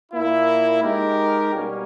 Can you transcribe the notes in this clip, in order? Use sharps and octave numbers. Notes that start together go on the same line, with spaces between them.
A#2 A#3 E4
G#3 D#4 G4 A#4
B2 G3 A#3 C#4